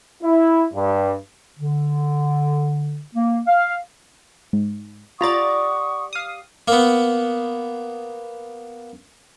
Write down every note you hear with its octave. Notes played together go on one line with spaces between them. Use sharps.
E4
G2
D3
A#3
F5
G#2
F4 G4 D5 F#5 A#5 C#6 D#6 A6
F5 D#6
A#3 B3